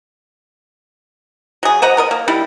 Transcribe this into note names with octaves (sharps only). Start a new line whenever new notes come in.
F#3 G#4
C5 D#5 F#5 A#5
B3 A#4 D#5
A#3
G3 D#4 E4